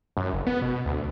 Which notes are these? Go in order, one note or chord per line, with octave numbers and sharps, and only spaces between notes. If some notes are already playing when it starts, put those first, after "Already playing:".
F#2
F#1
B3
B2
D2